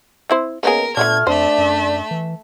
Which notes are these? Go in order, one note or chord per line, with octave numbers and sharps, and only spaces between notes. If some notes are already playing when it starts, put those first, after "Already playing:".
C4 E4 C5
C#2 A#3 B3 G#4 A#4
A#2 D3 A3 B3 D4 F6 G#6
F2 A3 D4 C5 E5
F#2
E3